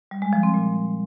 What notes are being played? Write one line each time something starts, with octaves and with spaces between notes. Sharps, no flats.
G3
G#3
F3
C4
A#2